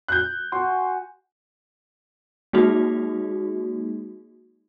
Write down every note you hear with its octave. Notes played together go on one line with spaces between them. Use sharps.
F#6 G6
F#4 G#5 C6
G#3 A#3 D#4 F#4 G#4